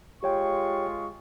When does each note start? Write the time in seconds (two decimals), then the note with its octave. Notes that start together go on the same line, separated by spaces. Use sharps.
0.23 G#3 F4 G4 C#5 G5 C#6